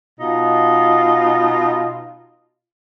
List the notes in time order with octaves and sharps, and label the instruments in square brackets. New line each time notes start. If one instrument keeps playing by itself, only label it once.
[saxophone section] B2 D#4 F4